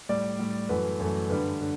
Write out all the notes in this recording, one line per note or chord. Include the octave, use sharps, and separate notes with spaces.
A2 G3 D5
A2 G3
F#2 E3 A3 B4
F#2 E3 A3
G2 D3 G3 B4
D3